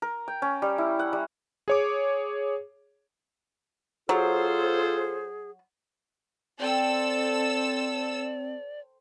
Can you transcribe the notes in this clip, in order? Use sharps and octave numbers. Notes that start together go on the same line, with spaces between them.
A#4
G5
C#4
G3
E4
F#5
G3
G#4 C#5 D6
F#3 F4 G#4 A4 C5
C4 A4 C5 D5 G5 E6